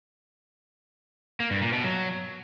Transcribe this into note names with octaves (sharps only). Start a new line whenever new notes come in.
A#3
G2
A#2
B2
F#3